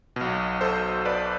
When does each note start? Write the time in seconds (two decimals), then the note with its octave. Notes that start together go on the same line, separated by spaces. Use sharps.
0.16 B1 B2
0.61 A4 C5
1.05 B4 D5